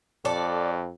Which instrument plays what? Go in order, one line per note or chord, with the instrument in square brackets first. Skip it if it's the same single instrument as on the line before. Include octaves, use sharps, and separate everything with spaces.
[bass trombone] F2 [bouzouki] A4 D5